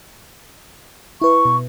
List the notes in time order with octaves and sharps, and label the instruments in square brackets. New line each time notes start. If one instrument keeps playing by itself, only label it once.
[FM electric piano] E4 B4 [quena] C#6
[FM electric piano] B2